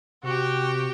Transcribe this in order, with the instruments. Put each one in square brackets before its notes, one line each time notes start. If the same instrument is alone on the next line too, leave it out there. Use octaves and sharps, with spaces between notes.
[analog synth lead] C3 [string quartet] F#4 G4 G5